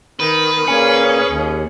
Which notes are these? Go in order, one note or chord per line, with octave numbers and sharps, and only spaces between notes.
D#3 B4
A#2 C#4 G#4 G#5 C#7 F#7
D#2